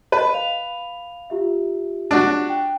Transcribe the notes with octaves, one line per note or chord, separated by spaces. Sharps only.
B4 D#5
F5 F7
F4 G4 E5
D4 F#4
G5